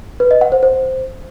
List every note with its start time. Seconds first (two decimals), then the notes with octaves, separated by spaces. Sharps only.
0.20 B4
0.31 D#5
0.41 F#5
0.52 C5
0.63 C5